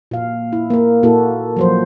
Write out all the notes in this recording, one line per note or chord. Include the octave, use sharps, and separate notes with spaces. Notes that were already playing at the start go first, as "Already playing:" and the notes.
A#2 F5
E4
A#3 A#4
A#2 A#3 E4 F#4 A4
F3 F#3 C5